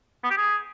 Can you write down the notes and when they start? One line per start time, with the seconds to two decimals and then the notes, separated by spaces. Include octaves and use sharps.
0.24 B3
0.30 G4
0.37 G#4